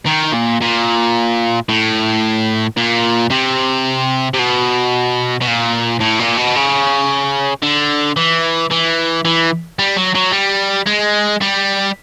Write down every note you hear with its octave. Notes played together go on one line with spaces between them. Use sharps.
D#3
A#2
A#2
A2
A#2
C3
C3
B2
B2
A#2
A2
A#2
B2
C#3
D3
E3
E3
E3
G3
F#3
F#3
G3
G#3
G3